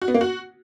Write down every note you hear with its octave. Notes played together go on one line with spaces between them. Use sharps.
F#4
B3
A#3
F#4